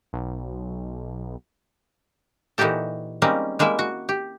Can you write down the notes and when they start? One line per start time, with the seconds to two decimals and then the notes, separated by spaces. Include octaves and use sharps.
0.13 B1
2.58 A#2 E3 D#4 F#4 G4 A4
3.22 G3 G#3 A#3 C4 C#4 D#4
3.59 G3 G#3 A#3 E4 E5
3.79 F#4
4.09 G4